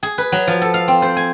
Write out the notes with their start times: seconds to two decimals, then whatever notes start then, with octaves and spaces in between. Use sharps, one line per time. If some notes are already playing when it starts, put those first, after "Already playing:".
0.03 G#4
0.18 B4
0.32 F#3
0.47 F3
0.61 A4
0.74 F5
0.88 C4
1.02 C5
1.17 G#5